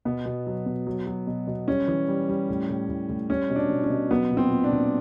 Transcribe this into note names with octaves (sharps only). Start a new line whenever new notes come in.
B2 B3
B2
F#3
B2
F#3
F#3
B2
B2
G3 C#4
E3
G3
G3
A2
A2
A2
A2
G3 C#4
B2
D4
B2
C#4
B2
F#3 B3
A#2
C4
A#2
D4
A#2